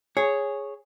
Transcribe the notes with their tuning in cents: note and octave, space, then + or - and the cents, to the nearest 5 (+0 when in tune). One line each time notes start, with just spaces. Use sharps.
G#4 +0 C#5 +0